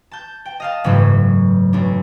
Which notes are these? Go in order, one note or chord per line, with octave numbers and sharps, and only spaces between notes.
A5 G6
G5
D#5 F5 A5
F#1 G#2 E3 F#3 A3
B1 D4